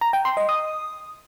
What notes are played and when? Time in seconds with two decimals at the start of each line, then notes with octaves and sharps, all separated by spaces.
0.01 A#5
0.13 G5
0.25 C6
0.37 D#5
0.49 D#6